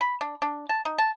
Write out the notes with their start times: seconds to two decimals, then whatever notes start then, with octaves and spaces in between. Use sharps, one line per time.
0.01 B5
0.21 D4
0.42 D4
0.69 A5
0.85 D#4
0.98 A5